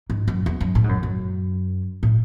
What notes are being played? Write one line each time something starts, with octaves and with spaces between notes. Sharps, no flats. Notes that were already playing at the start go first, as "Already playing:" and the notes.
G#2
F#2
E2
F#2
A2
G#2
F#2
F#2
A2